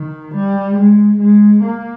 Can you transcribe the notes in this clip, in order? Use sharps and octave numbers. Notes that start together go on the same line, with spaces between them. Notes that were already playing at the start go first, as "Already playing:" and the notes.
Already playing: D#3
G3
G#3
G#3
A#3